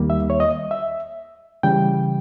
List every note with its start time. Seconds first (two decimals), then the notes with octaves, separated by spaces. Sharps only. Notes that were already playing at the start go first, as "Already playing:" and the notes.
Already playing: D#2 D#3 G3 A#3
0.10 E5
0.30 C#5
0.40 D#5
0.71 E5
1.63 C#3 E3 G3 G5